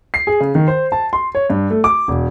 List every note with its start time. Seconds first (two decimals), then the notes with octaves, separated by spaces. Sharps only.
0.14 C7
0.27 G#4
0.40 C#3
0.55 D#3
0.68 C5
0.92 A5
1.13 C6
1.35 C#5
1.50 G2
1.70 A3
1.84 D6
2.08 E1